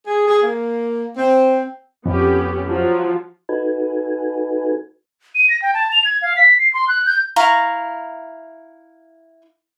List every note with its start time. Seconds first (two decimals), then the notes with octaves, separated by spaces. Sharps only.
0.06 G#4
0.27 G#4
0.42 A#3
1.16 C4
2.06 F2 B3 C#4 G4
2.67 F3 F#3 F4
3.49 D#4 F#4 A4 B4 G#5
5.35 D#7
5.49 A#6
5.62 G5
5.74 A5
5.92 F7
6.05 G#6
6.22 F5
6.37 B6
6.59 C7
6.74 C6
6.88 F#6
7.06 G6
7.36 E4 F5 A#5 C#6